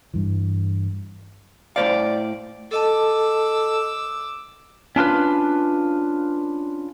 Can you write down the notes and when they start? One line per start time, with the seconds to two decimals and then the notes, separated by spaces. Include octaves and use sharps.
0.14 G2 E3
1.76 A2 C5 D5 F5
2.71 A4 D#5 A5 D6 E6
4.96 C#4 D4 F4 B4